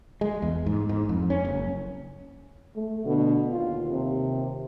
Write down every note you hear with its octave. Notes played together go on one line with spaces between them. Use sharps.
G#3
E2
G#2
G#2
F2
C#4
F#1
A3
B2 D3
D#2 F4
C3